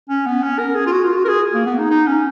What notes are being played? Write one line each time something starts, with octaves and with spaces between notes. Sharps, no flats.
C#4
B3
C#4
A#4
G#4
F4
F#4
F4
F#4
A#4
G#4
A#3
B3
D#4
D#4
C#4